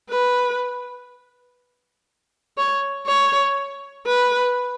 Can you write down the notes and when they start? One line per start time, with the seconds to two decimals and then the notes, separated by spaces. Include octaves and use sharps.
0.09 B4
2.57 C#5
3.07 C#5
4.06 B4